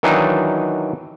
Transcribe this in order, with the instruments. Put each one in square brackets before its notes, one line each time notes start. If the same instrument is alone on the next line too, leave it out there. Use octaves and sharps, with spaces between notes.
[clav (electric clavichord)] D#3 E3 F#3 D4 D#4